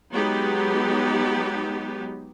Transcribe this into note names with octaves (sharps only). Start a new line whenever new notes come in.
F#3 G#3 B3 D#4 G4